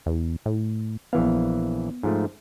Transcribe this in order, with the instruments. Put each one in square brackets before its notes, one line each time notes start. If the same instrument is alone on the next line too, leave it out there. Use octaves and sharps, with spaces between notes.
[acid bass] E2
A2
[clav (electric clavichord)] A#1 E3 F5 [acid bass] B3
[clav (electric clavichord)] G#2 F3 A3